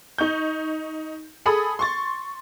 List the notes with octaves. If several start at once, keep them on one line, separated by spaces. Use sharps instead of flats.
D#4 C#6 G6
G#4 A4 B5 D#6
C6 C#6 A6